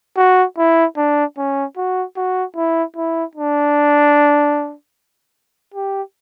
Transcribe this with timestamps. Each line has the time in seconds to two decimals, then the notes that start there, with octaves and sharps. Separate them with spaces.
0.17 F#4
0.58 E4
0.97 D4
1.38 C#4
1.77 F#4
2.17 F#4
2.56 E4
2.97 E4
3.35 D4
5.74 G4